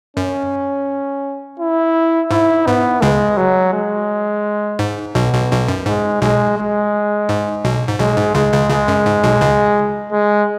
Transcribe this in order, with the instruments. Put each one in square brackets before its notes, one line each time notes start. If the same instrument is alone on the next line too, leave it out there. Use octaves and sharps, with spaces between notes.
[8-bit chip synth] F#2 [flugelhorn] C#4
[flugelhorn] E4
[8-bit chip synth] G#2 [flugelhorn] E4
[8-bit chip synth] G#2 [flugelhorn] B3
[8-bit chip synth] C#2 C#3 [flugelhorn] G#3
[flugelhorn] F#3
G#3
[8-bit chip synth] G#2
[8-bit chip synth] B1 B2 [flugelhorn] B3
[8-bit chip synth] B1 B2
B1 B2
F#2
[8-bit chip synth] G#2 [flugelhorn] G#3
[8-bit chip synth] B1 B2 [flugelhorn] G#3
[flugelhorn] G#3
[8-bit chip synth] G#2
B1 B2
G#2
[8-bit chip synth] B1 B2 [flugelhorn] G#3
[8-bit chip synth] G#2
[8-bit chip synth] C#2 C#3 [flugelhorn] G#3
[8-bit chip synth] C#2 C#3
[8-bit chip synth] C#2 C#3 [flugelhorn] G#3
[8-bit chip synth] F#2
G#2
B1 B2
C#2 C#3
[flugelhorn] G#3